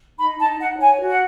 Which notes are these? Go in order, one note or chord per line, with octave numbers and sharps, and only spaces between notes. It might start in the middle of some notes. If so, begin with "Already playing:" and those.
D#4 B5
D#4 A5
D#4 F#5
C#5 G#5
F#4
F#5